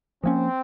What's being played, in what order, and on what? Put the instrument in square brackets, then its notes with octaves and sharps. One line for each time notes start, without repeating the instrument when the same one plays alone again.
[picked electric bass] F3 A#3 C#4 [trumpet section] C4